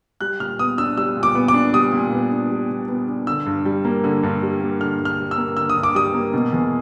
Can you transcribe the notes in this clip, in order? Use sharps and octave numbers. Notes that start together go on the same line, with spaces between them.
G3 F#6
A#2 F6
B3 D#6
D4 E6
G3 E6
A#2
D6
B3
D6
D4
G3 D#6
A#2
B3
D4
G3
A#2
B3
D4
D3 E6
G2
G3
A#3
D3
G2
G3
A#3
D3 F6
G2
F6
G3
E6
A#3
D3 E6
D#6
G2
D6
G3 D#6
A#3
B2
E2